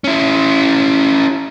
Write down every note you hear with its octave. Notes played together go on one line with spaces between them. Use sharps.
C#4 E4